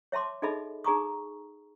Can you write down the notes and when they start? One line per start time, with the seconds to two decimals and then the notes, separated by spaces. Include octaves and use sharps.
0.12 C#5 E5 A5 C6 D6
0.42 D#4 G#4 A4 D#5 E5 B5
0.84 D#4 G#4 A5 A#5 C#6 D#6